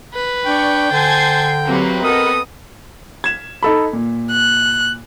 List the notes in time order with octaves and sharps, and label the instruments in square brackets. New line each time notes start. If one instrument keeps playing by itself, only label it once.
[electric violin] B4
[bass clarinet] D4 [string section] D5 C#6 [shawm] G5
[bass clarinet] D3 [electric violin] C5 A5 [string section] G#5 G#6 C7
[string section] C3 F#3 A#3 [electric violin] C4 B4
[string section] B3 A4 D#5 [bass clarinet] A#4 [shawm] D#6
[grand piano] G#6 E7
D#4 A4 B5
A#2
[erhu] F#6